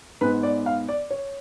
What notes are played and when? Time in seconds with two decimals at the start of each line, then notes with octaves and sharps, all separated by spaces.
0.21 G#2 G#3 B3 B4
0.43 D5
0.66 F5
0.89 D5
1.11 C#5